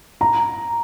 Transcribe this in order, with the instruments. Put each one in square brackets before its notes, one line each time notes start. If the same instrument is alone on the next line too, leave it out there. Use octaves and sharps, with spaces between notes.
[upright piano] A#5